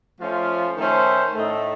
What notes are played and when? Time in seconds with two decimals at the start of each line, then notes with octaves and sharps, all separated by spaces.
0.19 F3 A3 C#4 F4
0.76 D#3 A3 C#4 A4 C5
1.34 A2 A3 D#4 A4